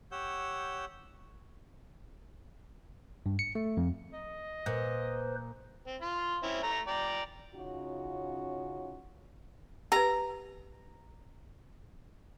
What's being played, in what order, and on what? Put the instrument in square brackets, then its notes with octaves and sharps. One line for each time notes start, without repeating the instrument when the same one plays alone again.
[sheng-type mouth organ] G4 C#5 F#5 E6 G6
[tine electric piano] G2
C#7
A3
F2
[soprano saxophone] D#5
[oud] A#2 [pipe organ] B4 C5
[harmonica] C4
F4 C6
C4 C#4 E4
A3 A#5
D5 G5 A#5
[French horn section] C#3 C#4 D#4 F4 F#4
[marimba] G4 B4 [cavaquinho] A#5